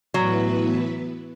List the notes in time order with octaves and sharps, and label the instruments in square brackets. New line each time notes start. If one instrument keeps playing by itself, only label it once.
[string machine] A2 E3 B3 E4 B4 [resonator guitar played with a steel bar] F#3